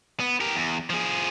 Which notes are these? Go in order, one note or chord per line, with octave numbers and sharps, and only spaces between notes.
B3
G4 A#4
E2
F3 G#4